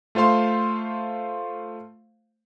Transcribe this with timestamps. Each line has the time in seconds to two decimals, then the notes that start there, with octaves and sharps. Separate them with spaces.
0.15 A3 F4 C5 F5 C6